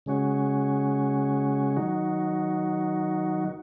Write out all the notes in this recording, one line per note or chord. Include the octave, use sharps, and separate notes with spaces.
C#3 G#3 C#4 F#4
D#3 F#3 D#4 F#4